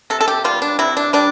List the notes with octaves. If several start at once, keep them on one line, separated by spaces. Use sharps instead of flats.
C3 A4
A4
G4
G3 B3 F4
D4
C3 E4
D4
G3 D4